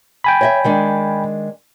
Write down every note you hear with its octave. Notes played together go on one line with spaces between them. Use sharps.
G5 G#5 B5
C#5 D#5 E5
D#3 G#3 D4